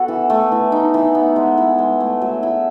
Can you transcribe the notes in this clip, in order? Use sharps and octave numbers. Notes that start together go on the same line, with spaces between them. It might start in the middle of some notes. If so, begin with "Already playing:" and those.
Already playing: B3 F#4 A4
E3
A3
E3
D#4
E3
B3
G#3
E4
G#3
A3
F#3
E4